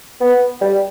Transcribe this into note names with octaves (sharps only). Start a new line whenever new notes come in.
B3
G3